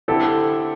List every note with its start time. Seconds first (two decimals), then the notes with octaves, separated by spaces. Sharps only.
0.08 D3 C4 E4 G4 A4